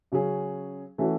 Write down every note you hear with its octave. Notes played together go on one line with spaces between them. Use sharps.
C#3 F#3 C#4 G#4
E3 A3 C#4 F#4 A4